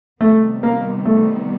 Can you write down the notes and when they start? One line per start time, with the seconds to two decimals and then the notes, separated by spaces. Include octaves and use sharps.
0.21 C3 D#3 G3 A3 B3
0.63 A#3
1.06 A3